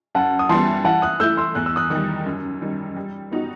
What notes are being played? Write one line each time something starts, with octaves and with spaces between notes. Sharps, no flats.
F#2 F#5 A5
D#6
E3 G3 B3 A5 C6
E3 F#5 A5
D#6 F#6
A3 E4 E6 G6
C6 E6
E2 F#6
E6
D#6 F#6
D#3 G3 D#6 F#6
F#2
D#3 G3
G3
B3 D#4 F#4